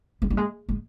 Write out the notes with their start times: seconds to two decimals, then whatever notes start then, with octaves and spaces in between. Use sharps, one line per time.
0.22 G#3
0.30 G3
0.37 G#3
0.69 G#3